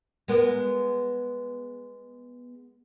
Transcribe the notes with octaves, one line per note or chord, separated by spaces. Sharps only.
G#3 B3 A#4